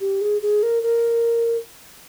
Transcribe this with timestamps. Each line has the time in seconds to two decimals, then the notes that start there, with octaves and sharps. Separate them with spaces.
0.01 G4
0.21 G#4
0.42 G#4
0.63 A#4
0.83 A#4